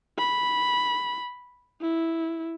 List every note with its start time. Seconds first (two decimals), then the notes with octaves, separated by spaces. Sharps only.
0.18 B5
1.81 E4